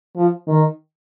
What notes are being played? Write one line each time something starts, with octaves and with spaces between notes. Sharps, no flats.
F3
D#3